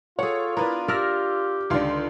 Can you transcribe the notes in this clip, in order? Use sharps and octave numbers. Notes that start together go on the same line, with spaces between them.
F4 G#4 A4 C#5 F#5
B3 D4 E4 A#4 B4
G4 A#4 D5 E5 E6 F6 A#6
C#2 D3 D#3 F5 C6